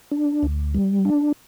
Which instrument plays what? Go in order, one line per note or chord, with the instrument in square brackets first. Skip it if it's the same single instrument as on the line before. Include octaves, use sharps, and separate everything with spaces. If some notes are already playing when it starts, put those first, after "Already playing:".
[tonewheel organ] D4
D2
G3
D4